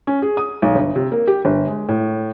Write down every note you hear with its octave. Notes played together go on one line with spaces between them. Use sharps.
C#4
G#4
D#6
B1
G1
C3
A#3
G4
G1
G#3
A2